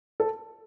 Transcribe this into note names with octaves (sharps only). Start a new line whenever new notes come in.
A4